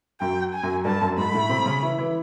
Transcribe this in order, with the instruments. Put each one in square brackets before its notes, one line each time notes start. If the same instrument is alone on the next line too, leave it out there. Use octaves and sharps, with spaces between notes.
[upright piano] F#2 F#3 [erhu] G5
[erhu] G#5
[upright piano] F#2 F#3
[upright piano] G2 G3 [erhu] A5
[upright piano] F#2 F#3
[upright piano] G#2 G#3 [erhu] B5
[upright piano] A2 A3
C3 C4
C#3 C#4
E3 E4
E3 E4